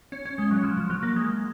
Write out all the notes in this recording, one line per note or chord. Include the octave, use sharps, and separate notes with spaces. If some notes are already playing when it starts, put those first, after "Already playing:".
C#4
C#4
G#3
F#3
F3
F3
F#3
A#3
G#3